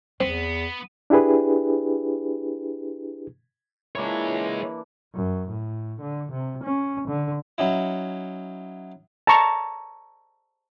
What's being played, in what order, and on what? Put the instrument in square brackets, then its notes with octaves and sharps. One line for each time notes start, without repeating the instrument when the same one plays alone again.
[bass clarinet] E2 [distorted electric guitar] B3 [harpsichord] C4
[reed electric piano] D4 E4 G4 G#4 B4
[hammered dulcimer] E3 A#3 D4 [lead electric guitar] G#3 C#5
[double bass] F#2
A2
D3
C3
C#4
D3
[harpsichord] F#3 C#4 D#4 E4
[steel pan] A5 A#5 C#6